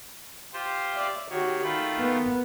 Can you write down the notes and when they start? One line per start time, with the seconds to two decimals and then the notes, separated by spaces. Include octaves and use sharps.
0.53 F4 G4 C5
0.94 D5 E5
1.30 D#3 F#4 G4 C#5
1.63 D#3 A3 F4 B5
1.99 B3 A#4